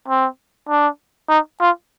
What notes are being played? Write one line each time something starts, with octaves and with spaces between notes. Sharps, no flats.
C4
D4
D#4
F4